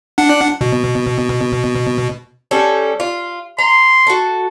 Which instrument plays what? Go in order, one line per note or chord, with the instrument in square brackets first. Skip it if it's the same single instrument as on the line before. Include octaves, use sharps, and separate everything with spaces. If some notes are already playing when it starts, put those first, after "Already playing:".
[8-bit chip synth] D4 F#5
B2
[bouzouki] G3 C#4 A4
F4
[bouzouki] A#5 [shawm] C6
[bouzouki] F#4 A4